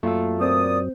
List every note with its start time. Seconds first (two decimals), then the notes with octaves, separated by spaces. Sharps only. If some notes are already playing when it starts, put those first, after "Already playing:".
0.03 F#2 F#3 A3 A#3 F4 A4 F5
0.41 A#2 C4 C5 D5 D#6